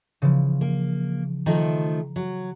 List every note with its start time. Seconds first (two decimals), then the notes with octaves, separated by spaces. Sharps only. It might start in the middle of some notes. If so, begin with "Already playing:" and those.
0.22 C#3 E3 F3
0.61 A#3
1.46 D#3 F3 A3 A#5
2.16 F#3